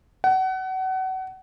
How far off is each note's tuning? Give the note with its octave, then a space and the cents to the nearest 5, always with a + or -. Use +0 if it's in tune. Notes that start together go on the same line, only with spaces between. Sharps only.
F#5 +30